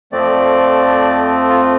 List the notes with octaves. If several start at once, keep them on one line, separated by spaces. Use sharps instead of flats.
F2 F3 A3 C4 D5
F4